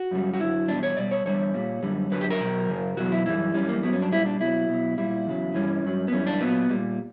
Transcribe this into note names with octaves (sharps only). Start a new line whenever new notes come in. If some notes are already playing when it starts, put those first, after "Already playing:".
Already playing: F#4
F#2 C#3 G3
F#4
F#2 D3 F#3 E4
E2 B2 G3 D4
C#5
B2 G3 D5
C#5
E2 D3 G3 C#5
A#2 G3
F#2 D3 G3
F#2 D3 F#3 B4
G4
A#4
B2 F#3
F#2 C#3
E2 B2 F#3 F#4
E4
F#2 E3 G3 E4
F#2 E3 G3 C#4
A#3
G2 F#3 B3
C#4
D4
A#2 G3 E4
D4
B2 F#3 E4
B2 F#3
A#2 G3 E4
E2 C#3 F#3
G2 E3 G3 C#4
G2 F#3
B3
F#2 E3 G3 C#4
D4
A#2 F#3 B3
A#2 G3